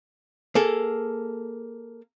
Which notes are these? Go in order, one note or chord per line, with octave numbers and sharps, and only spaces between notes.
A#3 G#4 A4